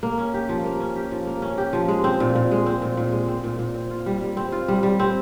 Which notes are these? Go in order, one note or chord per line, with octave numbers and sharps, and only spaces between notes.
A#3
C#4
G4
F3
A#3
C#4
G4
F3
A#3
C#4
G4
F3
G#3
C4
A#2
A#2
G#3
C4
A#2
A#2
G#3
C4
A#2
A#2
C4
F4
G3
G3
C4
F4
G3
G3
C4